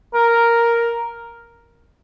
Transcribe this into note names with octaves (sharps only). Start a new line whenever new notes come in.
A#4